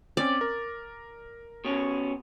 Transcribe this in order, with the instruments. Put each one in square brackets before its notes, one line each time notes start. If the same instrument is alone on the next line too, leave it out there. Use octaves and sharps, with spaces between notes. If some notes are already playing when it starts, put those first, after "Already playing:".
[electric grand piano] C4 C#4 [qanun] D5
[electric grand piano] A#4
[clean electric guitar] B2 C#4